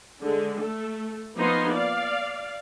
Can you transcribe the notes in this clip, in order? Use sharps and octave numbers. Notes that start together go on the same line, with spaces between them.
D3 G#3
A3 A4
F3 A#3 B3 D#4 C6
D5 F5